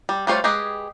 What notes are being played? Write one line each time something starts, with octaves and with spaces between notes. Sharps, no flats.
G3
G3 A3 F4 C5 C#5
G#3 G4 G#4 B4